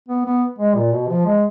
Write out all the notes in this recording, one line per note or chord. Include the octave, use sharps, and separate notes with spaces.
B3
B3
G#3
A#2
B2
F3
G#3